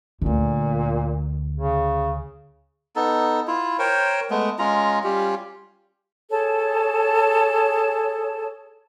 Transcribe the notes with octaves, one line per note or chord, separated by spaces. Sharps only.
D2 A#2 D3
C#3
B3 D#4 A4
E4 F4
A#4 C5 C#5 G5
G#3 A3 B3
G#3 C#4 F4 A#5
G3 C#4 F4 G4
G#4 A4 C#5 A5